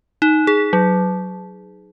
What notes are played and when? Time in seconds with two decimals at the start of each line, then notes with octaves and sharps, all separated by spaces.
0.22 D#4
0.47 G#4
0.73 F#3